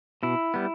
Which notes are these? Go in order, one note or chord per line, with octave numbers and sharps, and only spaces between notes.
B2 E4
G3 B3